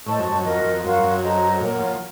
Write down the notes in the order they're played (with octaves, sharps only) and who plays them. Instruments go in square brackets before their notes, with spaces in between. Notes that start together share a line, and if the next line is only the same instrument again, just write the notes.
[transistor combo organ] A2 [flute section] C5 D#5 A5 C#6
[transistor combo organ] F#2
F#2
[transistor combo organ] F2 [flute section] F#4 A#4 D#5
[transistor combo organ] F2
[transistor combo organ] F#2 [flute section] F#4 A#4 F5 C6
[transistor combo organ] F#2
[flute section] A4 C5 D#5 A#5
[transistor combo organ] A#2 [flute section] A#4 C#5 F#5
[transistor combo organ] F3